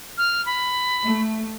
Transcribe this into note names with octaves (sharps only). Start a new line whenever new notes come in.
F6
B5
A3